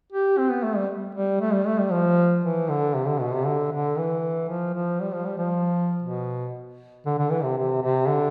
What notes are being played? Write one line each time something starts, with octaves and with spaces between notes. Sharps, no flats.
G4
C4
B3
A3
G3
G3
A3
G3
A3
G3
F3
E3
D3
C3
D3
B2
C3
D3
D3
E3
F3
F3
G3
F3
G3
F3
B2
D3
D3
E3
C3
C3
C3
D3